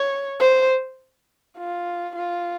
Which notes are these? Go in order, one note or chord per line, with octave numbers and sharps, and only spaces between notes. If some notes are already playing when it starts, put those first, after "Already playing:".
Already playing: C#5
C5
F4
F4